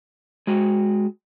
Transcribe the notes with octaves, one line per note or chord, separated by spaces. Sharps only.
G#3 F#4